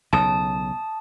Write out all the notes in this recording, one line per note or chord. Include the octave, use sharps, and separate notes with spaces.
B1 C#3 A5 D#6